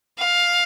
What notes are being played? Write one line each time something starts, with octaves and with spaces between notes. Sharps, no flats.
F5